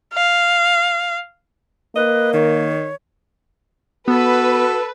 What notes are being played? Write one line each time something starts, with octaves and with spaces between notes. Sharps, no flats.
F5
A#3 B4 D#5
D#3 C#5
B3 F#4 A4 B4